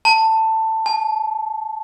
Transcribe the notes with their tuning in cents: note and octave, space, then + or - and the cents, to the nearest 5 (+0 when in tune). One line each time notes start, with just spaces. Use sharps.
A5 +15
A5 -40